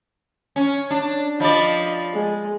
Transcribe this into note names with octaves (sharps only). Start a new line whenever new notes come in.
C#4
D4
F3 D5 D#5 B5
G#3